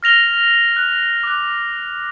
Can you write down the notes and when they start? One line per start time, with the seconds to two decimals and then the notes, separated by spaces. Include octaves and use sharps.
0.03 F6 A#6 F7 G7
0.76 F#6
1.23 D6 F#6